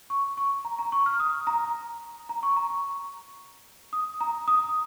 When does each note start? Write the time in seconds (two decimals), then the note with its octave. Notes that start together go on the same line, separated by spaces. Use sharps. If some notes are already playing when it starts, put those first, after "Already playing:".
0.10 C#6
0.37 C#6
0.65 A#5
0.79 A#5
0.92 C#6
1.06 F6
1.20 D#6
1.47 A#5
2.29 A#5
2.43 C#6
2.56 A#5
2.70 C#6
3.93 D#6
4.20 A#5
4.48 D#6